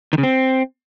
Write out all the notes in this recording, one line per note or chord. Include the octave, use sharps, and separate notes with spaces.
D#3
C#3
C4